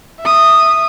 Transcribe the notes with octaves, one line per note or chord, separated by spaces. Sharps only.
E5 D#6